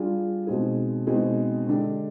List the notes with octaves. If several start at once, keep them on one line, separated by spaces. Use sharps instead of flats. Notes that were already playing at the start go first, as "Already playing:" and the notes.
Already playing: G3 D4 F4 G#4
B2 G#3 C4 D#4 G#4
B2 G#3 C4 D#4 G#4
D3 G#3 D4 G4